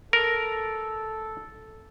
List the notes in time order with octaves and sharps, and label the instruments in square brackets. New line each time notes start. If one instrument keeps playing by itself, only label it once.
[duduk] A4 [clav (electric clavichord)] A#4